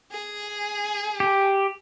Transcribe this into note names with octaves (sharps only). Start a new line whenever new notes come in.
G#4
G4